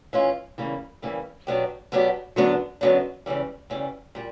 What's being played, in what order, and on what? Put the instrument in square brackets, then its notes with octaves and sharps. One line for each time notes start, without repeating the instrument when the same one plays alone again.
[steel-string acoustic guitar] E3 G#3 C#4 F4
E2 C#3 E3 G3 A#3
E2 C#3 E3 G3 A#3
B2 F#3 B3 D4 G4
B2 F#3 B3 D4 G4
F#2 D3 F#3 B3 D4
F#2 D3 F#3 B3 D4
E2 C#3 E3 G3
E2 C#3 E3 G3
A#2 G3